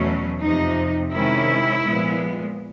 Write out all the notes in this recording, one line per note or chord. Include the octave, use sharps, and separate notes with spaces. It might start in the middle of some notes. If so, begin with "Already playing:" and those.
Already playing: E2 B2 F#3 A3 C#4
F2 C3 F3 D#4
C3 D#3 G#3 C#4 E4
A#2 F3 G#3 B3